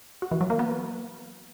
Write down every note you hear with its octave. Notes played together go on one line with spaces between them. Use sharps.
F#4
E3
F#3
A#3
B3